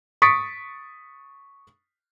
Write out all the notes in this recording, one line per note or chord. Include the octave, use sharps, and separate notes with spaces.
C#6 D#6 A6 B6 C#7 D7